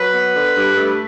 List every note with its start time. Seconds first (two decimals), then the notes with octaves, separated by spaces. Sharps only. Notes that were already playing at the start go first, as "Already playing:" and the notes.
Already playing: F#3 B4
0.12 B3
0.33 D3
0.54 G2
0.74 A3